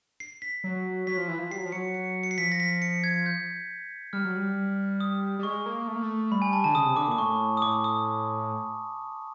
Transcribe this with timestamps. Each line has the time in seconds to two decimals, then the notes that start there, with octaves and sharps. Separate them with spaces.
0.20 C7
0.42 B6
0.64 F#3
1.07 F#3 B6
1.17 F3
1.28 E3
1.39 F3
1.51 G3 C7
1.58 F#3
1.65 F3
1.72 F#3 C#7
1.94 C#7
2.23 C#7
2.31 C7
2.38 F3 B6
2.52 A#6
2.60 B6
2.82 C#7
3.04 G#6
3.26 G6
4.13 G3 F6
4.25 F#3
4.37 G3
5.00 D#6
5.39 G3
5.43 G#3 C#6
5.66 A#3
5.88 A3
5.96 A#3
6.03 A3
6.31 G3 B5
6.42 G#5
6.53 A5
6.64 D3 A5
6.75 C#3 D#6
6.85 C3
6.96 D3 D6
7.08 A#2 D6
7.18 A2 C#6
7.57 D#6
7.62 A2 D6
7.84 D#6